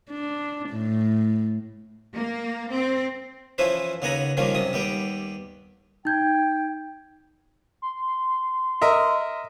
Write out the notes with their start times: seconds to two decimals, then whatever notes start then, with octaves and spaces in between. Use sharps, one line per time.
0.10 D4
0.70 A2
2.14 A#3
2.71 C4
3.58 E3 F3 C#4 E4 B4 C5
4.02 D#2 C#3 B3 F#5 G#5 A#5
4.37 D#3 F3 G3 A#3 C#4
4.55 F#2 C3 D#6
4.73 D#2 G3 B3 G5
6.05 D#4 G5 G6 G#6
7.82 C6
8.82 A#4 D#5 E5